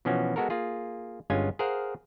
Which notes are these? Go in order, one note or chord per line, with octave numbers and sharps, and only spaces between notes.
B2 E3 F3 C#4 F#4
G#3 B3 F#4 A4 A#4
A#3 F4 G#4
G1 G2 G#3 C#4 F4 G#5
G#4 A#4 C5 F5 F#5